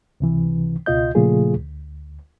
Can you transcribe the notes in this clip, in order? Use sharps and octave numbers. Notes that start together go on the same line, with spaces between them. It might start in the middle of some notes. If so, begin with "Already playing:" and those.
C#2 C3 E3
C#2 B2 F4 D#5 G6
A#2 C#3 F3 A3 F4 G#4
D2